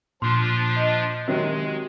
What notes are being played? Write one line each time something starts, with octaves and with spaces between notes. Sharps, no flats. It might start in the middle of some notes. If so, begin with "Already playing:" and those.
A#2 F3 D4 F4 C6
D#5
C3 D#3 F#3 G#3